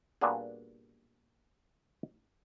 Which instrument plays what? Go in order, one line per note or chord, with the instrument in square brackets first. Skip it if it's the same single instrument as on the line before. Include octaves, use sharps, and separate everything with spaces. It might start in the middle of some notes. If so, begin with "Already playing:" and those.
[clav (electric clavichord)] A#2 G3 B3 D4 F#4 G#4